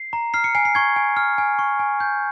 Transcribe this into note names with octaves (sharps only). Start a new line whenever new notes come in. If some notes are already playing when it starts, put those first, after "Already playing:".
Already playing: C7
A#5
F6 C7
C#7
G#5 C7
C7
C#6 G#6
G#5
F6
G#5
C#6
G#5
G6